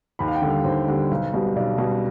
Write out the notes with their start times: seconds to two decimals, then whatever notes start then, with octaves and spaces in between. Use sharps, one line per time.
0.19 D#2 B5
0.28 F5
0.35 G5
0.42 D3 G3
0.50 F5
0.65 D#2 C5
0.88 D3 G3
1.11 B1
1.33 B2 G3
1.56 B1 D5
1.78 B2 G3